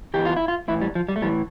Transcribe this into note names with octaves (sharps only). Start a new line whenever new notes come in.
E2 C3 E3 G4
F4
E4
F4
A2 E3 E4
G3
F3
G3
A3
A2 E3 G3